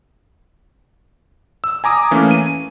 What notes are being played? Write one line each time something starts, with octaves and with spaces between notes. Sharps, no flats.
E6
G#5 A#5 D6 D#6
E3 A3 A#3 C#4
D#7